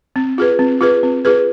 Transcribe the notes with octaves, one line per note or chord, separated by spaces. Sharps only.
C4
F4 G#4 B4
C4
F4 G#4 B4
C4
F4 G#4 B4